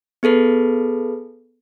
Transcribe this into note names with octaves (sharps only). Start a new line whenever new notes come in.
B3 G#4 A4 B4